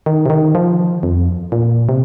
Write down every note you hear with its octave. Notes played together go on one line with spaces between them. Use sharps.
D#3
C3
D#3
F3
F2
A#2
C3